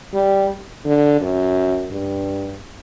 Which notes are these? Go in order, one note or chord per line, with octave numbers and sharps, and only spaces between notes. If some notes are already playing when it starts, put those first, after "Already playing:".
G3
D3
F#2
G2